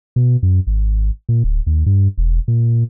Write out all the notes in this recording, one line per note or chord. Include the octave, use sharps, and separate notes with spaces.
B2
F#2
G#1
A#2
D1
D#2
G2
E1
A#2